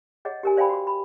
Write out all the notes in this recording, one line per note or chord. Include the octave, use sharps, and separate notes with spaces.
G#4 C#5 D#5 F#5
G4 A#4 G#5
C5 D5 F5 G5 G#5 B5
F#4 C#6
B5